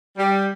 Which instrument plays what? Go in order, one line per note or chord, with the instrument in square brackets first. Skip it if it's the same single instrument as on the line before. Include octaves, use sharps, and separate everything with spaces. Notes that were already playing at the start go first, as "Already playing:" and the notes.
[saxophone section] G3